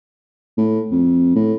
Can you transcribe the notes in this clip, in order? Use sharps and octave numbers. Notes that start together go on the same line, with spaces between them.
A2
F2
A2